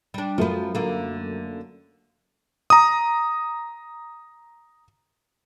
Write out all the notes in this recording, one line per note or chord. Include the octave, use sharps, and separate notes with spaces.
G3 D4
F#2 F3 A3 B3 A#4
D3 A#3
A#5 D#6